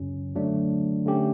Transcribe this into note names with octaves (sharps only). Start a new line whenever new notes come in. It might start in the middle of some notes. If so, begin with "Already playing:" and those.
Already playing: F#2 C#3 F#3 C#4
D3 F#3 A3 D4
D3 A3 C#4 G4